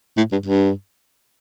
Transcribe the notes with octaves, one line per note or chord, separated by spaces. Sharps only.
A2
G2
G2